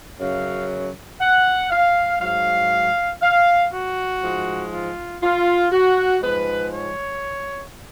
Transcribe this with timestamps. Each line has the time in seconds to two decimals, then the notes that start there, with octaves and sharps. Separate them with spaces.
0.20 F#2 C#3 F#3 F5
1.21 F#5
1.70 F5
2.21 G#2 F#3 F5
3.22 F5
3.72 F#4
4.22 G#2 F3 G#3
4.72 F4
5.22 F4
5.72 F#4
6.22 G#2 F3 G#3 B4
6.72 C#5